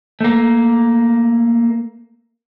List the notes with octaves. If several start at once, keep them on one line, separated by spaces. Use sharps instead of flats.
A3 A#3